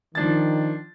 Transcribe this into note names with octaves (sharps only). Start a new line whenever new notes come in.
D#3 F3 D4 A6